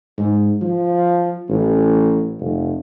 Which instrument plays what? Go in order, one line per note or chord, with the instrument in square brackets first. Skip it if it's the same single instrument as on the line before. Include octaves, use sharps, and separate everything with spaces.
[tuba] G#2
F3
A1
F1